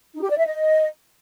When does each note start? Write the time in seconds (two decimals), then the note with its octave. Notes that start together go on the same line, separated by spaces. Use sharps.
0.14 D#4
0.22 G4
0.30 D5
0.38 E5
0.46 D#5